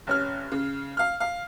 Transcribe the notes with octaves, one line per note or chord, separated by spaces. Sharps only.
F1 C#4 F6
C#3
F5 F6
F5